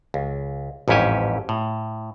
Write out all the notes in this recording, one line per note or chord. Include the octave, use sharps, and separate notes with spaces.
C#2
A1 F2 G#2 C#4 G4 G#5
A2